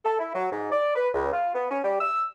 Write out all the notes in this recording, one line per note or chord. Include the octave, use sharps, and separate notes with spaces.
A4
E4
F#3
G#2
D5
B4
C#2
F4
B3
C#4
G3
E6